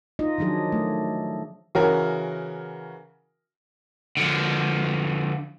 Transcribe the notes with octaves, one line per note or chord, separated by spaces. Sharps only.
D#4 F4 D#5
D#3 F3 F#3 D4 G#4
A3
C#3 E3 F#4 A#4
D3 F3